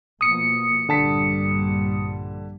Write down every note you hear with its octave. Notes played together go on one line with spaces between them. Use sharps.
B2 F3 A#3 D#6 C#7
A#1 G2 D3 G3 A5 B6